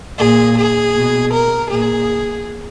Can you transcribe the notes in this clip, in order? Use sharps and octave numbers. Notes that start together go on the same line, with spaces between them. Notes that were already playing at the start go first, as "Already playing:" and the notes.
A#2 G#4
G#4
B2
A#4
A#2 G#4